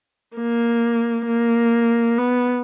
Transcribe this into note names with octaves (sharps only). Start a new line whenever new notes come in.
A#3
A#3
B3